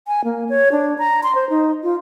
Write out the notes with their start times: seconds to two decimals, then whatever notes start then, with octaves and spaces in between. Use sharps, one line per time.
0.07 G#5
0.24 A#3
0.49 C#5
0.72 D4
0.98 A#5
1.23 C6
1.35 C5
1.50 D#4
1.83 F4